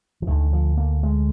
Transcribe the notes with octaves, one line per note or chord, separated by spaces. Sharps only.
F3
D2 D3 D#3
F3
A#3
G#3